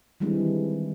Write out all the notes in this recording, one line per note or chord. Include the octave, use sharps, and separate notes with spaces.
D#3 E3 G3 G#3 C4 D4